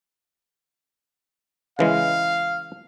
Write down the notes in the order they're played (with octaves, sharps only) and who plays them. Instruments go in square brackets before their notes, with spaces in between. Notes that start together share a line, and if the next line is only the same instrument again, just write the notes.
[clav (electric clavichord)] C#3 E3 G#3 [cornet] F5